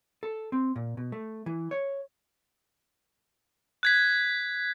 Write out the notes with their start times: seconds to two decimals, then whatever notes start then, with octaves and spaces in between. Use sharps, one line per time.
0.23 A4
0.52 C4
0.76 A#2
0.97 B2
1.12 A3
1.46 E3
1.71 C#5
3.83 F#6 G#6 B6